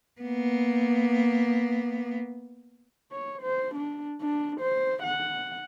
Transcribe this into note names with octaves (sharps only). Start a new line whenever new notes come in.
A#3 B3
C#5
C5
D4
D4
C5
F#5